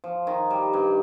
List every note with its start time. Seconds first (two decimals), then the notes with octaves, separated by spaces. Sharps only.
0.04 F3
0.27 D#3
0.50 G3
0.73 G2